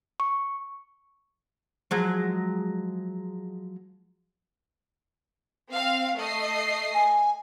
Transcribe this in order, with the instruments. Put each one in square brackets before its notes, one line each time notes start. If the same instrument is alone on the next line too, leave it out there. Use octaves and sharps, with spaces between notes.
[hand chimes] C#6
[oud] F3 F#3 G#3
[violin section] C4 F5
A3 D#5 C7
[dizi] G#5